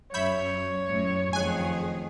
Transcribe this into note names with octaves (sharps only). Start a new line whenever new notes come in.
F#2 C#5 E5 B5 G6
F#2 A2
F2 D#3 A3 G#4 G#5 F#6